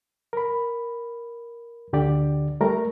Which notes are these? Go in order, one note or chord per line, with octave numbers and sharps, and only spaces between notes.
A#4 B5
D2 D3 G4 D5
G3 A3 A#4 A#5